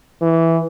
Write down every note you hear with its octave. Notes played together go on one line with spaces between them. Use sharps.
E3